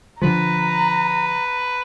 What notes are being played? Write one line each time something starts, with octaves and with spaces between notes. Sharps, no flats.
D3 F3 B4 A#5